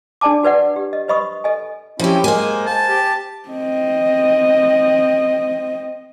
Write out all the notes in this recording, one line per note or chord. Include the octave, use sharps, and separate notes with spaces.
D4 G#4 D5 G#5 A5 D6
F#4 B4 D5 F#5
G4
D#5
B4 C5 D#5 B5 C#6 D#6
A4 D#5 G#5
F3 C4 C#4 E4 G4
G#3 A#3 C5 G#5
A5
G4
C4 D#5